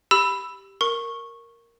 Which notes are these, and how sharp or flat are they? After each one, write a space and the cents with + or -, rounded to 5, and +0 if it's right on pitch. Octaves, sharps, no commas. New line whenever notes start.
G4 +0 B5 +0 E6 +0
A#4 +0 C#6 -10